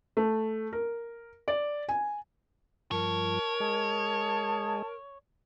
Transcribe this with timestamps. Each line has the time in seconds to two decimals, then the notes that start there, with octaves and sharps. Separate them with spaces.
0.17 A3
0.73 A#4
1.48 D5
1.89 G#5
2.91 G2 F3 A#4 C#5 A5
3.60 G#3 D#5 G#5 A5